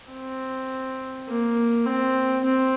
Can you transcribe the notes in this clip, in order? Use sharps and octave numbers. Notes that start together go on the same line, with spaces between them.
C4
A#3
C4
C4